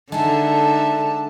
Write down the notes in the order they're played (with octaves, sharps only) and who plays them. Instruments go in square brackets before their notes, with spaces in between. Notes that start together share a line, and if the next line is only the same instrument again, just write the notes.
[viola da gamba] D3 [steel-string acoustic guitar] G#3 A4 [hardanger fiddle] D#4 E5 [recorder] A5